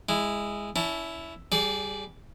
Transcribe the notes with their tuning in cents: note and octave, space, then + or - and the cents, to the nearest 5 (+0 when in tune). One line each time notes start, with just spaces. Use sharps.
G#3 -10 E4 +5
C#4 +40 E4 +0 A5 +25
G3 +0 G#4 +20 D5 -25